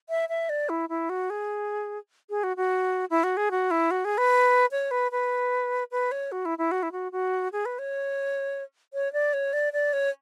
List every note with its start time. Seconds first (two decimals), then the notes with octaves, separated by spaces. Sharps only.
0.09 E5
0.29 E5
0.49 D5
0.69 E4
0.89 E4
1.09 F#4
1.30 G#4
2.30 G#4
2.43 F#4
2.57 F#4
3.10 E4
3.23 F#4
3.37 G#4
3.51 F#4
3.71 E4
3.91 F#4
4.05 G#4
4.18 B4
4.71 C#5
4.91 B4
5.11 B4
5.91 B4
6.11 C#5
6.32 F#4
6.45 E4
6.58 E4
6.71 F#4
6.83 E4
6.92 F#4
7.12 F#4
7.52 G#4
7.65 B4
7.79 C#5
8.93 C#5
9.13 D5
9.33 C#5
9.53 D5
9.73 D5
9.93 C#5